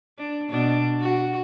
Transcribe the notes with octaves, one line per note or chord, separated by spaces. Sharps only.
D4
B2 D4
F#4